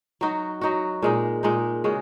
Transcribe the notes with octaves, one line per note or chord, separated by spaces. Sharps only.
F#3 D#4 F#4
F#3 D#4 F#4
A#2 G#3 D#4
A#2 G#3 D#4
C#3 G#3 F#4